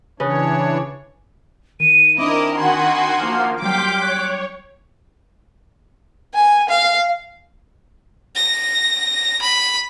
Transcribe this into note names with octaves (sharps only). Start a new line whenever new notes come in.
C#3 E3 D4 B4 C#5
D#3 D#7
C4 D4 E4 A#4 D#5 D6
D#3 F#4 G#5 B5 C6
F3 A#3 F6
F#3 G3 G5 C6 D6 F6 G6 B6
C#5 F#6
G#5
F5
A#6
B5